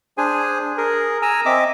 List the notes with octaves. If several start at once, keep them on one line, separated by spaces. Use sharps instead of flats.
D4 G#4 C5 G#5
G#4 A#4
G#5 A#5 E6
C4 D#5 E5 D6